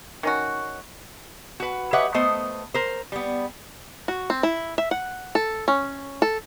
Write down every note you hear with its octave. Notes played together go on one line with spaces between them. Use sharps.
D#3 C#4 F#4
F#4 B4
G4 B4 C#5 D#5 E5 F#5
A3 B3 C5 D#5
A#4 C5
G3 B3
F#4
C4
E4
E5
F#5
A4
C#4
A4